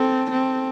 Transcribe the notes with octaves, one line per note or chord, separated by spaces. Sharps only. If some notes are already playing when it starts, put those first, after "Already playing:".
Already playing: C4 A4
C4